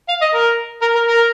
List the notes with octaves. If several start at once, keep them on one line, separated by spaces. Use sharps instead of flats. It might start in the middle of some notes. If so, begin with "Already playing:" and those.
F5
D#5
A#4
A#4
A#4
A#4